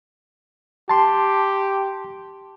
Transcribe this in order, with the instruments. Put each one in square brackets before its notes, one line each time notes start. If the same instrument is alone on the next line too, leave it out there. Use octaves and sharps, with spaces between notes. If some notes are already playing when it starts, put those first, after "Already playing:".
[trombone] G4 [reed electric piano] A5 C6